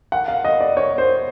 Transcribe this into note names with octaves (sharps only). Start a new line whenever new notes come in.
F#5
F5
D#5
D5
C#5
C5